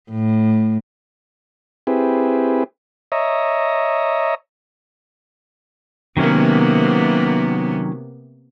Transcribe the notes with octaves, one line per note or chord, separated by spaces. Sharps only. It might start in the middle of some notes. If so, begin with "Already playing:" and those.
A2
C4 E4 G4 G#4 B4
C#5 D#5 E5 A#5
C3 D#3 F#3 A#3 B3 C#4